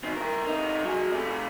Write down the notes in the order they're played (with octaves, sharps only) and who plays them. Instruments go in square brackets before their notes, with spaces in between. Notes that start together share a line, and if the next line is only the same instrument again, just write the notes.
[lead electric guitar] D#3 C4
E4 A#4
C3 D#4
F#3 G#4
C3 A3